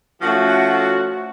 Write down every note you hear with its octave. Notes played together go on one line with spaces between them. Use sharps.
F3 A3 C#4 F#4